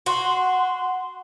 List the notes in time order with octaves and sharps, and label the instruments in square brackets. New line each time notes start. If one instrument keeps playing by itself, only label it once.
[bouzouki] F#4 [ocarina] C6